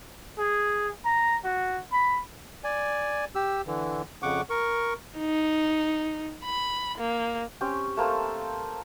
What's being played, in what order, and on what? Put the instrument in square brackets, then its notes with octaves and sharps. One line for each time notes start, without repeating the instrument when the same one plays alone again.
[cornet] G#4
A#5
F#4
B5
[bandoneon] D5 G#5
G4 E6
D3 E3
F2 C#3 F#5 C#6 D6
A#4 C#6
[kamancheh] D#4
B5
A#3
[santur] C4 C#4 G4
A3 A#3 C4 A4